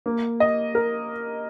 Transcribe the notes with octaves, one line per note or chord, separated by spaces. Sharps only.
A#3
D#5
A#4